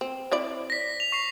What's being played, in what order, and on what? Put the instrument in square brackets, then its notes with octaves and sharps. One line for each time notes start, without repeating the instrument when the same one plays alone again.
[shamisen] C4
C4 E4 D5
[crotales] A#6 B6
F7
C#6 C7